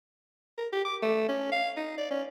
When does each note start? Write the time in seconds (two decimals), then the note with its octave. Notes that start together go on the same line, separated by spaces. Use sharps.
0.58 A#4
0.73 G4
0.85 D6
1.02 A3
1.28 C#4
1.52 F5
1.77 D#4
1.98 D5
2.11 C#4